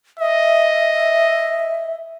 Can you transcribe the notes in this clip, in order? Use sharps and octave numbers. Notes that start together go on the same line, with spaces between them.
D#5 E5